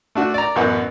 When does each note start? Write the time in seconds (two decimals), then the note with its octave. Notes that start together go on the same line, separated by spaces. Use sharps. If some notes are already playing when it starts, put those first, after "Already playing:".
0.15 A3 D4 F#4
0.34 D5 A#5
0.56 A1 F#2 B3 F#5